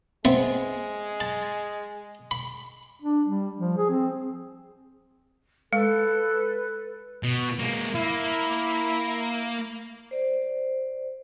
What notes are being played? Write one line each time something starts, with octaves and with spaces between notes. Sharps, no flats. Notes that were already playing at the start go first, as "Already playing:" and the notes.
G#3 B3 C4 E5
A5
B5
D4
G3
F3
G#4
C4
G#3 A4 B4
B2
G#3 A#3
A#3 E4
C5 D5